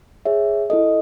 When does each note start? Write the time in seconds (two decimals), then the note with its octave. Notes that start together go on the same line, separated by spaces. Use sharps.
0.25 G#4 C#5 E5
0.70 E4 A4 D#5